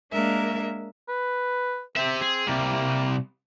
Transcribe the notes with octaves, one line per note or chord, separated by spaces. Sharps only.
G#3 A#3 D4 A#4 E5
B4
C4 G4 E5
G#4
C3 G3 A#3